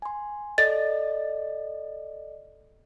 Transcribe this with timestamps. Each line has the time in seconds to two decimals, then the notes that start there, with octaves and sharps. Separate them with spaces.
0.02 G#5 C6
0.58 A4 D5 D#5 A6